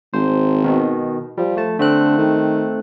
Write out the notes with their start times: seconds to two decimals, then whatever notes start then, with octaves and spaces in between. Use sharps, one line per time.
0.14 G#1 C5
0.64 B2 D#3
1.38 F3 G3
1.57 A3 A5
1.79 D3 A3 C4 F#6
2.18 D#3